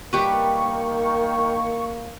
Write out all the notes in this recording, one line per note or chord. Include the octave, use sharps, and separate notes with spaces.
D#3 G3 A#3 G4 B4 C#6